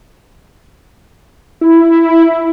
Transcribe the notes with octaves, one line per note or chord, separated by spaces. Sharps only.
E4